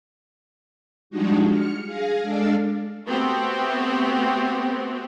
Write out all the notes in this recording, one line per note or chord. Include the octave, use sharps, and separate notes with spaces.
F3 G3 G#3 D4 D#4 F#4
F6 C#7
G#4 F5 A#6
G#3 D4 A4 D5 F5
A3 B3 C4 F#4 G4